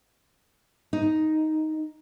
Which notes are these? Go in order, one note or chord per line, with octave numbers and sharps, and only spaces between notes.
D#4